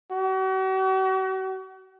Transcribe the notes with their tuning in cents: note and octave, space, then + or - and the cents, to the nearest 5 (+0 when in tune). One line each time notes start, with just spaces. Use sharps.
F#4 +40